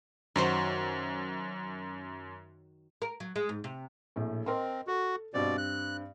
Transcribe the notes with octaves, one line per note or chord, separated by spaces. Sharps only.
F#2 D#3 F#3 C5
A#4
F#3
G#3
G#2
C3
A#1 A2
C4 A#4 D#5 C6
F#4 A4
G2 B2 C4 D5
F#6